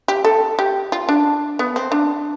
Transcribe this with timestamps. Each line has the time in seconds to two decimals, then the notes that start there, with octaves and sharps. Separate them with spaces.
0.08 G4
0.24 A4
0.59 G4
0.92 F4
1.09 D4
1.59 B3
1.76 C4
1.92 D4